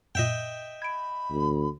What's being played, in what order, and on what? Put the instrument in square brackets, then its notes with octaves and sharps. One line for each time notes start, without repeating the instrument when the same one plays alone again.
[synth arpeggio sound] F#2 A#2 [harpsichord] D#5 E5 G5
[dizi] B5 [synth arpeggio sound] G#6 D7
[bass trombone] D2